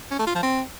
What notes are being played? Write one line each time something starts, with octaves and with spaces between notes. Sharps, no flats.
C#4
A3
F4
F3
C4